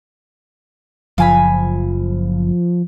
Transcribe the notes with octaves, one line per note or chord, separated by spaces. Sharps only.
F#1 F3 F5 G#5 B5